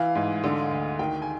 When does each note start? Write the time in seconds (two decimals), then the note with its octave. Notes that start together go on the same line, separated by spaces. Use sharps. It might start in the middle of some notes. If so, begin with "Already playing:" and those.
Already playing: E3 F5
0.15 G#2
0.44 D3
0.71 D2
0.99 D#3 G5
1.22 G#5